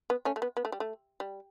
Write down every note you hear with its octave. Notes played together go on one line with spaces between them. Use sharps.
B3
A3 C#4
A3
B3
B3
A3
G3
A3
G3